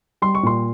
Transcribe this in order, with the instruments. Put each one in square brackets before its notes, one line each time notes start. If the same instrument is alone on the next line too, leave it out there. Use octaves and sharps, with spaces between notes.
[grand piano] G3 C6
C#6
A#2 C6